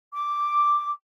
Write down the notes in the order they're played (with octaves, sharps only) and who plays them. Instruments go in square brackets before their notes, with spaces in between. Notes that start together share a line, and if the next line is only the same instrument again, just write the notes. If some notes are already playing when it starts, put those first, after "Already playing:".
[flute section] D6